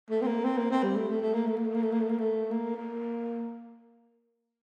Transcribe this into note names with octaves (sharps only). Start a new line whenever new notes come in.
A3
C4
A#3
C4
A#3
C4
G3
A3
A3
A3
A#3
A3
A#3
A3
A#3
A3
A#3
A3
A#3
A3
A#3
A#3